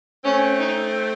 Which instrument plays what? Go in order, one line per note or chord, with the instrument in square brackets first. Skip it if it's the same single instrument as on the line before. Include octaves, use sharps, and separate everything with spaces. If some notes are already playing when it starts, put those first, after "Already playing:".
[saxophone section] A3 C4 [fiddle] C#4
[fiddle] D#4